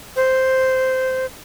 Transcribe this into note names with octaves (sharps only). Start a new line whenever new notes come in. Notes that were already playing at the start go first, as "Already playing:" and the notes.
C5